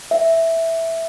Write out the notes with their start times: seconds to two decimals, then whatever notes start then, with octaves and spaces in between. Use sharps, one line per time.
0.11 E5